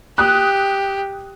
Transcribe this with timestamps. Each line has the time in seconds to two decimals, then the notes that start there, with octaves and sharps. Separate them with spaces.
0.18 G4 D#6 F#6